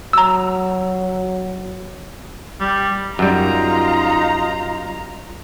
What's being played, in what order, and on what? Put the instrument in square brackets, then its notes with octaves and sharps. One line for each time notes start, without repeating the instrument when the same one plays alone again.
[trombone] F#3 [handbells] A#5 E6
[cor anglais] G3
[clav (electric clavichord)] F#2 G3 [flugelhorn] D#4 [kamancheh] F4 A#5